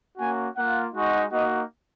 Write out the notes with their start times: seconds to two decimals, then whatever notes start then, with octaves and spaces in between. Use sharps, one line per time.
0.18 A#3 C#4 F#4 G#5
0.56 A#3 F4 F#5
0.94 G#3 D#4 F#4
1.31 A#3 D#4 F#4 D#5